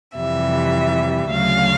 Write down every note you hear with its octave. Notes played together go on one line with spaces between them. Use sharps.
F2 C3 E3 G3 E5
D2 C#3 F#3 F5